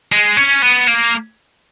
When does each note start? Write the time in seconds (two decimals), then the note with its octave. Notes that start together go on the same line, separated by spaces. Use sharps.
0.12 G#3
0.37 C#4
0.62 B3
0.88 A#3